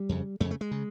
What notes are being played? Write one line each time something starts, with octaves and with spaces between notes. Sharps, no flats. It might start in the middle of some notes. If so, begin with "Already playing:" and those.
Already playing: G3
F2 C#3
F2 C#3 A3
A3
G#3
C#3